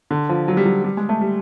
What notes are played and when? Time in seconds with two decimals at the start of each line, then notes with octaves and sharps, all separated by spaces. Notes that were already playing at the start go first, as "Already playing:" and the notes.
0.11 D3
0.29 F3
0.48 F#3
0.57 G3
0.66 F#3
0.84 G3
0.97 G#3
1.09 A3
1.21 G3